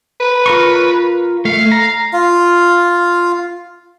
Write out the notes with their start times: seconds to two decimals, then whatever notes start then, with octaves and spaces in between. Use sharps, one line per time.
0.20 B4
0.46 F4 A#4 C#6
1.45 A3 F5
1.72 A#5
2.13 F4 F5